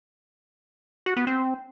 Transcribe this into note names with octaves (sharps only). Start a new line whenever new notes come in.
F#4
B3
C4